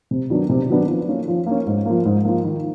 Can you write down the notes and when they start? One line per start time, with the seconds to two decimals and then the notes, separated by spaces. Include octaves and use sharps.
0.11 C3
0.30 D#3 F#3 B3 D4
0.50 C3
0.69 D#3 F#3 B3 D4
0.88 F3
1.08 A#3 C#4
1.28 F3
1.46 A#3 C#4
1.67 G#2
1.86 F3 A#3
2.05 G#2
2.25 F3 A#3
2.44 D#3